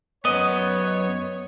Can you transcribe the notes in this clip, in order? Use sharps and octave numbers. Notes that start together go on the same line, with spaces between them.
F#2 B3 C#5 D#5